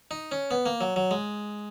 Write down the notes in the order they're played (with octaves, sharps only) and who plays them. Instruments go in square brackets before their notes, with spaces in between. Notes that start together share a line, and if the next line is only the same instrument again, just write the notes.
[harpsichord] D#4
C#4
B3
A#3
F#3
F#3
G#3